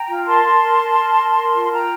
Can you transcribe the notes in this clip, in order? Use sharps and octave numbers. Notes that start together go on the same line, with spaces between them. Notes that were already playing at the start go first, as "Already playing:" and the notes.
Already playing: G5 A#5
F4
A#4 A5 C6
A#4
A#4
A#4
A#4
A#4
A#4
F4
C6
F4 G5 A#5